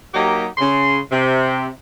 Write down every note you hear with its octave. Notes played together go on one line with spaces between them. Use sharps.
F#3 A#3 D#4 G4
C#3 C6
C3